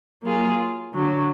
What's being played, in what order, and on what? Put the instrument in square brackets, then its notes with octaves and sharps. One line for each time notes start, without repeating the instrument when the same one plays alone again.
[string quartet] F#3 A#3 F4 G#4
D3 F#3 D4